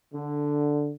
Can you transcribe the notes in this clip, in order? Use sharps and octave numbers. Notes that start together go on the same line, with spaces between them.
D3